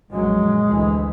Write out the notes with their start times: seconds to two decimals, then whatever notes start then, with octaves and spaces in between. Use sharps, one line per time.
0.11 A#1 F#2 F#3 G#3
0.66 D2 E3